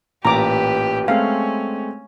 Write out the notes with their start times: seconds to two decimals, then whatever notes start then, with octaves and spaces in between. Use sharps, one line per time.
0.25 A1 A#2 G4 B4 A#5 D6
1.08 G#3 A3 C4 C#4 F5